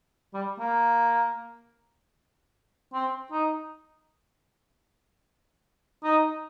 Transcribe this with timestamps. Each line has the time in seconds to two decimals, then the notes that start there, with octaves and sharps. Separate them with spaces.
0.34 G3
0.60 A#3
2.93 C4
3.32 D#4
6.04 D#4